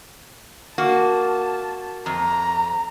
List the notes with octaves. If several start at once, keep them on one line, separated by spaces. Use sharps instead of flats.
A#3 F#4 A5
F2 A#5